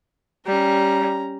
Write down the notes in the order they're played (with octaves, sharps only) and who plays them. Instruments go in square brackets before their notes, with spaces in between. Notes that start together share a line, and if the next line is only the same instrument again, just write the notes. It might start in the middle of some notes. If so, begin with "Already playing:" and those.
[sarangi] G3 [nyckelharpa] C#4 A#5